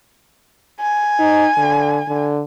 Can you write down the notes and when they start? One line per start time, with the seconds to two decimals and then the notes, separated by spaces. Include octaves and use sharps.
0.80 G#5
1.19 D#4
1.57 D3
2.08 D3